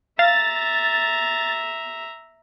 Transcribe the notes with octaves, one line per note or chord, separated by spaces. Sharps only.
E5 F5 A#5 A6